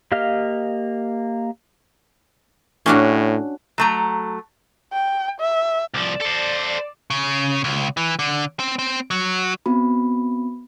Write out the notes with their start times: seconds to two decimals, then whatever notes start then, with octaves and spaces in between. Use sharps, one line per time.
0.12 A#3 G4 D#5 F5 F6
2.86 A2 C#4 D4 F#4
3.78 F#3 A3 A#5
4.93 G5
5.40 E5
5.94 C2 F3 D5
6.21 A4 C5 D5
7.10 C#3
7.64 C#2
7.97 E3
8.19 D3
8.60 C4
8.79 C4
9.11 F#3
9.66 B3 C4 F#4 B5